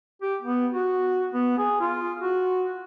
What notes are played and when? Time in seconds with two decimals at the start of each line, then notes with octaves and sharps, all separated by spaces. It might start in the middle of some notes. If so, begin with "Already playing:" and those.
0.22 G4
0.42 B3
0.73 F#4
1.34 B3
1.58 G#4
1.81 F4
2.20 F#4